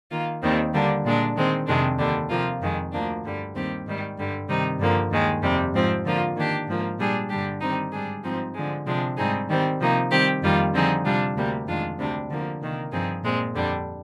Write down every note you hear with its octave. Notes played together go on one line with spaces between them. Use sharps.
D#3 A#3 F4
D#2 D#3 G3 C4
D3 G3 A#3 D4
A#2 G#3 D4
D#3 G#3 C4
F2 C3 D#3 G#3 D4
D#2 D3 G3 D4
C3 F3 A#3 F4
F2 D#3 G#3
D2 D3 F3 A#3 D4
G2 D3 G3
D#2 D#3 G3 C4 G4
G#2 D#3 G3
G2 D3 G3
C3 D#3 G3 C4 D#4
G2 D3 F3 A#3
D#2 D#3 G#3
F2 C3 G3
G#2 F3 C4
D3 F3 A#3 F4
D#3 A#3 D4 G4
G#2 F3 A#3
A#2 G3 D4 G#4
G2 D3 G3 D4 G4
D#3 G3 C4 D#4
G#2 G3 D4 G#4
G#2 F3 C4 D#4
D3 F3 G#3
C3 F3 G#3 D4
G#2 G3 C4 D#4 G#4
D#3 G3 C4
C3 F3 A#3 D#4
D#3 G3 C4 G4
F2 D#3 G3 A#3 F4
D3 F3 C4 D#4 G#4
C3 G3 D4 F4
D2 C3 G3 A#3
F2 D#3 G#3 D4 F4
D2 C3 G3 D4
D3 F3 A#3
C3 D#3 A#3
G2 F3 C4 D#4 G#4
A#2 G#3 C4
F2 D3 G3 D4